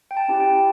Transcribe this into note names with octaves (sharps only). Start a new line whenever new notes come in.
G5
A5
C#4 E4 G4
G5